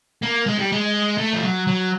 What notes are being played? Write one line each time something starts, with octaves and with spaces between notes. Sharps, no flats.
A#3
G#3
G3
G#3
A3
F3
F#3
F#3